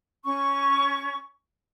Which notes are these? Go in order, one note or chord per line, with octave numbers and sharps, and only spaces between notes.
C#4 C#6